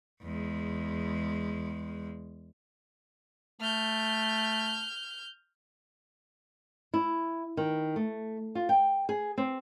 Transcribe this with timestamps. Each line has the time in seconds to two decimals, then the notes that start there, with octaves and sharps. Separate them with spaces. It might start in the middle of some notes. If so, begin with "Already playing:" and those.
0.22 E2 G#3
3.61 A3 F6 G6
6.94 E4
7.57 D#3
7.96 A3
8.55 F4
8.69 G5
9.09 G#4
9.38 C4